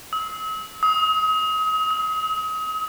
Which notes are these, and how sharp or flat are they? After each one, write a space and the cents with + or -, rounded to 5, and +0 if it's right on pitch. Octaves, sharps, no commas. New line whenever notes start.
E6 -45
D#6 +35
E6 -45